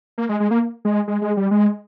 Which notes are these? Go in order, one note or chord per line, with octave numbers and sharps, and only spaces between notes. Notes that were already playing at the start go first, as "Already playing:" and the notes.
A#3
G#3
G#3
A#3
G#3
G#3
G#3
G3
G#3